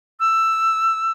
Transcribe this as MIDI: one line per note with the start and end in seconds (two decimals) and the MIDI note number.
0.20 1.12 88